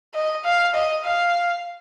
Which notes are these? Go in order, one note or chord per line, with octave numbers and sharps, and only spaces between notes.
D#5
F5
D#5
F5